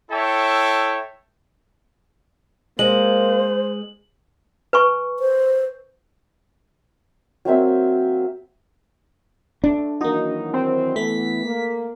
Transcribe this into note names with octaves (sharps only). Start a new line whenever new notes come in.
E4 A4 C#5 E5 G5
G#3 A#3 C5 F#7
B4 G#5 C#6
C5
F#3 A#3 C4 E5
A3 D4
D#3 E3 F#3 A#3 D#4 F#4
C4
E3 A3 B3 B6
A#3